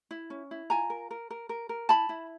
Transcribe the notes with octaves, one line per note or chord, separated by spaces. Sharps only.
E4
C#4
E4
F4 G#5 A#5
A#4
A#4
A#4
A#4
A#4
E4 A5 B5
E4